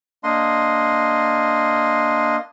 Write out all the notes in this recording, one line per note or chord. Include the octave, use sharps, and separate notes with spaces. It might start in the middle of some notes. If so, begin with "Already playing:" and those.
A#3 D4 D#5 C6